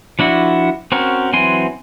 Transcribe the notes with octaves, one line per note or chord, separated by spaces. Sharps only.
F3 D4 E4 F#4
C4 C#4 F#4 A#4
E3 F#3 C4 G#5 C6